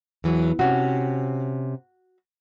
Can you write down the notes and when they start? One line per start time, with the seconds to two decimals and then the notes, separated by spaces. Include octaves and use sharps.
0.24 E2 E3 F#3
0.59 C3 C#4 F#4